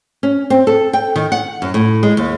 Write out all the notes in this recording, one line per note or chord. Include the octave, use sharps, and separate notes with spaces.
C#4
C4
A4
G5
D#3
F#5
F#2
A2
G#3
D#2